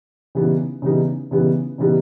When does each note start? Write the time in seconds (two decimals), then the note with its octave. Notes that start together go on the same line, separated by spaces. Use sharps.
0.35 C#3 E3 G3 B3 D#4
0.82 C#3 E3 G3 B3 D#4
1.31 C#3 E3 G3 B3 D#4
1.78 C#3 E3 G3 B3 D#4